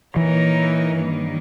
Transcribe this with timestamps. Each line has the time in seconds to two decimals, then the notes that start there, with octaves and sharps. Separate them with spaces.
0.16 A#2 E3 A#3 D#4 A#4 C#5
0.96 G2 D#3 G3 A#3